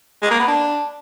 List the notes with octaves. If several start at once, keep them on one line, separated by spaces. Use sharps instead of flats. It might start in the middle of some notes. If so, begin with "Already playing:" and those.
G#3
A#3
B3
D4